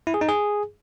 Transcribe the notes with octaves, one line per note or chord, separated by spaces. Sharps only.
E4
G#4
D#4
G#4